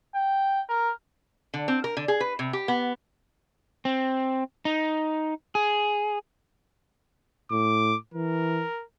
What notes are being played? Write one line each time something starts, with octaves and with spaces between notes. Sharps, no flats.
G5
A#4
D3
C4
A#4
D3
G#4
B4
C3
G4
B3
C4
D#4
G#4
A2 D6
E3 A#4